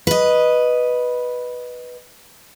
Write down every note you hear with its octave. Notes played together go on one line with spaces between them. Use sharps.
B4 D#5